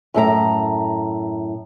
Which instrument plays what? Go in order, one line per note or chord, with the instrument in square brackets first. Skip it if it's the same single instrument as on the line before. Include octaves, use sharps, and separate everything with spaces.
[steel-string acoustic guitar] F#2 A2 A4 A#5